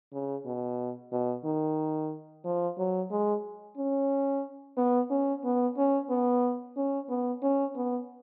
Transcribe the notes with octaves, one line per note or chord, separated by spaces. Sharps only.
C#3
B2
B2
D#3
F3
F#3
G#3
C#4
B3
C#4
B3
C#4
B3
C#4
B3
C#4
B3